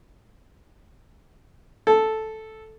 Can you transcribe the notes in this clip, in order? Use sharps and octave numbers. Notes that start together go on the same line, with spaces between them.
A4